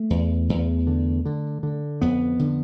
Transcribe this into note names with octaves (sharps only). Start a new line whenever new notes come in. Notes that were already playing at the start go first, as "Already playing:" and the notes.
Already playing: A3
E2
E2
D3
D3
D3
F2 B3
D3